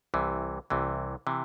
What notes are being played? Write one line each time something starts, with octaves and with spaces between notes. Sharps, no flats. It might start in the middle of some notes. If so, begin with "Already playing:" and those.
C2 C3 E3
C2 C3 E3
C3 E3